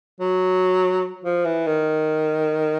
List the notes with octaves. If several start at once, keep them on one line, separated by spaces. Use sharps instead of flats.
F#3
F3
E3
D#3